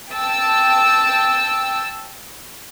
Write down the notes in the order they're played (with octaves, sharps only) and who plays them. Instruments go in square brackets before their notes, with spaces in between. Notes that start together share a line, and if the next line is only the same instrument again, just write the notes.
[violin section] G5 A5 E6